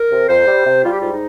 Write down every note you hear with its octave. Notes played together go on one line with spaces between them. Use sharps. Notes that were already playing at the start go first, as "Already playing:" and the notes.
Already playing: A#4
C3
F2 C5
G3
C3
G3 F4
G4
G#2 F4
D#4